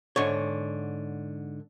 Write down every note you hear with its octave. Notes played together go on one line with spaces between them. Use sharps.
G#2 D3 C#5